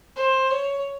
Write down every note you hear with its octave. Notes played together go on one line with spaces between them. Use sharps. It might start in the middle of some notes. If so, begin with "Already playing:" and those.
C5
C#5